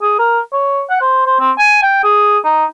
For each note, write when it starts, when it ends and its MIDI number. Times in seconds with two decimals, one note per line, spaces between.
0.02 0.15 68
0.19 0.40 70
0.53 0.83 73
0.90 0.99 78
1.01 1.25 72
1.26 1.38 72
1.40 1.51 60
1.58 1.81 80
1.83 1.99 79
2.03 2.38 68
2.44 2.65 63